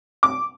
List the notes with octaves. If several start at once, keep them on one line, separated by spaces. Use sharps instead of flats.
D6